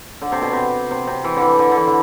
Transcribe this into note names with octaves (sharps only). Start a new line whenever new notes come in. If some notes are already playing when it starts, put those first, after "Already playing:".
D3
C3
B2
C3
C3
C3
E3
D3
E3
D3
D3
E3
D3